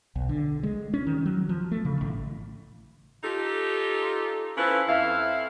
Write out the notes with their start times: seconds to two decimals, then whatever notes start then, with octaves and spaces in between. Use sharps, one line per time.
0.16 B1
0.29 D3
0.63 G#3
0.94 C#4
1.07 D#3
1.26 F#3
1.49 F3
1.71 A3
1.85 C#3
2.01 A1
3.24 D#4 F4 G4 A4
4.57 C#4 E4 F4 A4 B4 C5
4.88 F2 E4 F5